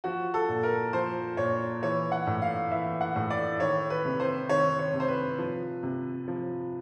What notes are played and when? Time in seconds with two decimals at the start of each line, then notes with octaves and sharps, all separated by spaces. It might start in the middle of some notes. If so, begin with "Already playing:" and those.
0.04 F3 F#4
0.34 A4
0.49 A#2
0.63 A#4
0.93 F3 C5
1.37 A#2 C#5
1.83 E3 C#5
2.12 F#5
2.27 A2
2.42 F5
2.71 E3 E5
3.01 F#5
3.16 A2
3.30 D5
3.60 D#3 C#5
3.90 B4
4.05 C3
4.20 C5
4.49 D#3 C#5
4.79 C#5
4.93 C3
5.00 C5
5.08 B4
5.38 F3
5.83 C3
6.28 F3